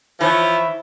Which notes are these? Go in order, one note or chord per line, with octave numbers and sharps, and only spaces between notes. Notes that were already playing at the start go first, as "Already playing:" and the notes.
E3 F3 C#5 E5